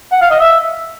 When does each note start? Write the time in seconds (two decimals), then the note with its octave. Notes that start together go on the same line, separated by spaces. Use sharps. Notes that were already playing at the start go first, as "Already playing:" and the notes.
0.12 F#5
0.21 F5
0.31 D#5
0.40 E5